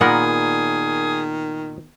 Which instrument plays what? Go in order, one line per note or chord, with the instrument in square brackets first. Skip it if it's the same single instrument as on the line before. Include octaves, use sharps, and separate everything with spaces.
[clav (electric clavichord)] A#2 A#4 [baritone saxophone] D#3 [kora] B3 F#5 [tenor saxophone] G#4